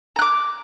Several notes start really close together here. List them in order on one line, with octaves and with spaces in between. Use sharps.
A#5 F#6 D6